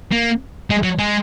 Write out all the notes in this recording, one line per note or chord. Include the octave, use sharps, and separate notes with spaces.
A#3
G#3
F#3
G#3